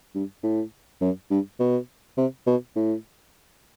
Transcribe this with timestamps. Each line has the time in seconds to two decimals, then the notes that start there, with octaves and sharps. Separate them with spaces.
0.15 G2
0.43 A2
1.01 F#2
1.31 G2
1.60 B2
2.17 C3
2.46 B2
2.76 A2